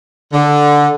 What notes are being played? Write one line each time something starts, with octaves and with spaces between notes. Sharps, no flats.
D3